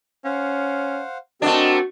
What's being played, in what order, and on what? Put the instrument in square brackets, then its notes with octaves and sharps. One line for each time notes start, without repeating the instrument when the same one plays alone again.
[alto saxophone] C#4 [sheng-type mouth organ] C5 F5 F#5
[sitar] A3 D4 [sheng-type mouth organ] C4 A#4 [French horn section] F#4 [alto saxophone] D#5